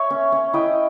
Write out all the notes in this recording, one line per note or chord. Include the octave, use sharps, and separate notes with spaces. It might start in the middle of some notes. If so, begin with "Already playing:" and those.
Already playing: C#5 E5
C#4
C#4
E4 D#5 G5